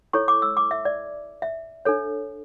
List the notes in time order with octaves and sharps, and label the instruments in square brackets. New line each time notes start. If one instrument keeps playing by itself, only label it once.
[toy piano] E4 A4 C#5 C#6
D6
E6
D6
E5
D5
E5
D4 A4 C#5